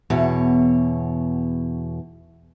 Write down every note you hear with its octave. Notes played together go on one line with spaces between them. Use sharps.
E2 B2 C#5